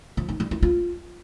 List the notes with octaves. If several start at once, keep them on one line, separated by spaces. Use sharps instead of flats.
F3
D#4
G3
E4
F4